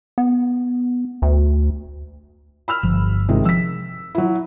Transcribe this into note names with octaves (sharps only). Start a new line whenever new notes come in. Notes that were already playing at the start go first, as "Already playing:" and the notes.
B3
D2
B5 E6 F6
G1 F3
C3 D#3 G#3
F3 E6 B6
F#3 E4